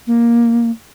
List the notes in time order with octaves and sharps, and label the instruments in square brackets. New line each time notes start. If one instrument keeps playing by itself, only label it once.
[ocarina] A#3